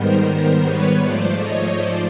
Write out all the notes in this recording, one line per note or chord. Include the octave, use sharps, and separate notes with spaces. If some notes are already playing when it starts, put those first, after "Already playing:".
Already playing: G#2 D#3 G3 B3 A#4 C5
A#4 C5
B4 C#5
G#2 F3 A3 C5 D5
C#5 D#5
C5 D5